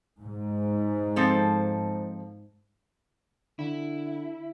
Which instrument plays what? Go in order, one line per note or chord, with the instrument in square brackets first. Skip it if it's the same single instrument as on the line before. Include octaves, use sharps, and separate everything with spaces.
[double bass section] G#2
[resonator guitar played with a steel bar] F3 C4 A4
[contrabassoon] D3 [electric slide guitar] E4